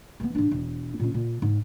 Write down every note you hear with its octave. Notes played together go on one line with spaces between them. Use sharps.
E3 B3
G#2 D4
E1
A#2 C#4
A#2
G#2